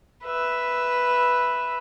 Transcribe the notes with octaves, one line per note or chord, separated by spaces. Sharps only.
B4 E5